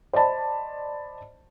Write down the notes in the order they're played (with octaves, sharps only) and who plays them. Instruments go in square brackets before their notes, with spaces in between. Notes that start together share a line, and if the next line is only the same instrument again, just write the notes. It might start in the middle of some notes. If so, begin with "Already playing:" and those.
[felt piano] C5 D5 D#5 A5 B5